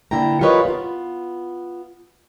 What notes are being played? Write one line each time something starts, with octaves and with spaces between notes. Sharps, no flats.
D3 A#3 E4 G5 A#5
F4 G4 A#4 B4 C#5 D#5
B3 F4